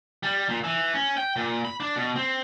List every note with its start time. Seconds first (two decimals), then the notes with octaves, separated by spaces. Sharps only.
0.23 G3
0.49 A#2
0.64 E3
0.93 C#4
1.17 G5
1.36 A#2
1.65 B5
1.80 D4
1.96 B2
2.16 C4